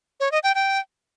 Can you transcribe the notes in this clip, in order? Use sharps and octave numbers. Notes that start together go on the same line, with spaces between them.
C#5
D#5
G5
G5